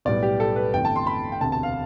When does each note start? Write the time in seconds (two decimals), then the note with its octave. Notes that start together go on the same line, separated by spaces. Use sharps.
0.05 B1 A2 G3 B3 D5
0.23 G4
0.40 A4
0.56 B4
0.73 G1 F2 E3 A3 G5
0.85 A5
0.96 C6
1.07 B5
1.32 G5
1.41 E1 D2 C3 A5
1.52 A5
1.63 F5